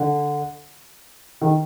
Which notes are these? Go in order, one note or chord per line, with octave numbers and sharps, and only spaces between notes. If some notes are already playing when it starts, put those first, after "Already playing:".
Already playing: D3
D#3